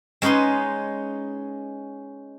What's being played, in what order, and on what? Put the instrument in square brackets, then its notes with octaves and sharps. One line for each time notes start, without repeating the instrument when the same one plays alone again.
[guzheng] G#3 C#4 D#4 B4 C6